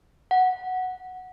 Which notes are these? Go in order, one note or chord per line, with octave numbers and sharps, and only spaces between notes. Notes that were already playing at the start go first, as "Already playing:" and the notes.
F#5